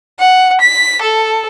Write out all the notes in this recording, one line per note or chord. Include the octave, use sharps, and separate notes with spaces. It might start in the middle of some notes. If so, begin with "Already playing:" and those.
F#5
B6
A4